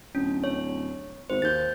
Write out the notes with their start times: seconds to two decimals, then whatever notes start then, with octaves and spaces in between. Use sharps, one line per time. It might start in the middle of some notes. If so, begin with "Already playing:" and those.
0.15 D1 C#4
0.44 C#5
1.30 G#1 C5
1.42 D#2 G6 A6